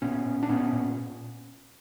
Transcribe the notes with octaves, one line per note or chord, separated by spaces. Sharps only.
A#2 B3 C#4
A#2
D4
A#2 B3 C#4
A#2